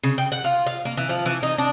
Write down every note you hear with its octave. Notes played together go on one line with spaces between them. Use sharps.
C#3
G5
F#5
F4
F5
A#3
E3
F3
E3
D#4
D4